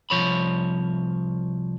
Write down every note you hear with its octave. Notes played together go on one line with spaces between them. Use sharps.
C2 F3 C#5 B5